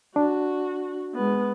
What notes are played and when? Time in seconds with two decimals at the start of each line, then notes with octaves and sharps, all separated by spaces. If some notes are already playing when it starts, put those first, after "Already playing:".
0.16 D4 F#4
1.15 G#3 B3